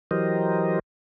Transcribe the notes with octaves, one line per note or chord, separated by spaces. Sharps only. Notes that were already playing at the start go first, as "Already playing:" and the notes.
E3 F#3 G4 A#4 C5 D#5